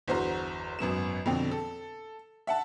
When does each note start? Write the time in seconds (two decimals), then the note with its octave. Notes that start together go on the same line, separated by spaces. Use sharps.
0.08 G1 E2 F#4 C5 A#5 C6
0.79 G#1 F#2 B3 E7
1.26 F2 B2 D3 C4
1.51 A4
2.47 E5 F#5 A5